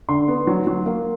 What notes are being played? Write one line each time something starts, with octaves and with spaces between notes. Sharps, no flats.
D3 C6
B3
F#3
F#3
A#3